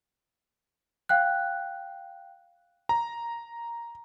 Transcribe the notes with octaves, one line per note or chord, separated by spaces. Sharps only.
F5 G5 F#6
A#5